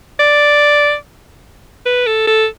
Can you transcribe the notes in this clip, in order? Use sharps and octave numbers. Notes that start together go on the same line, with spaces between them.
D5
B4
A4
A4